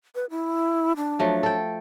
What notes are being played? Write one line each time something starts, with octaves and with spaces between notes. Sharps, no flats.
B4
E4
D4
F3 F#3 A3
A4 G5